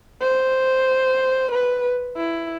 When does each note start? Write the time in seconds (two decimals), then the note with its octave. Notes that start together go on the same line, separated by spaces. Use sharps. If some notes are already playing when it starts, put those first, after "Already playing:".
0.22 C5
1.52 B4
2.17 E4